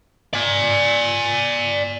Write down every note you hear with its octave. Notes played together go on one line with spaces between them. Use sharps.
D5 G#5